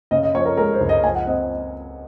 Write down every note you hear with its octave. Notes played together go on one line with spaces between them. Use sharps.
C#3 D#5
D#5
F3 C#5
A#4
G#3 A#4
C5
C#2
D#5
F3 G#5
F#5
C4 D#5